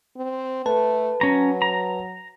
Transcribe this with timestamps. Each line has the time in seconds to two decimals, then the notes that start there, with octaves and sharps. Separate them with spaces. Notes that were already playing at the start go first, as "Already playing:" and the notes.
0.17 C4
0.66 A3 B4 A5
1.21 F#3 C#4 A#5
1.62 A#5